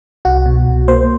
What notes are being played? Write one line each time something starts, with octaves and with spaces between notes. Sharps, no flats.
C2 F#4
B2
C2
A#3 C5